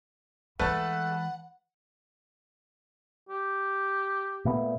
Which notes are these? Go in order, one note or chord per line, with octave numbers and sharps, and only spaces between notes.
E3 G#3 A3 B4 F#5 A5
G4
A#2 A3 B3